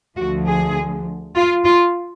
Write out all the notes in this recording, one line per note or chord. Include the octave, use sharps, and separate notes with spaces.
D2 D3 F3 F#4
G#4
F4
F4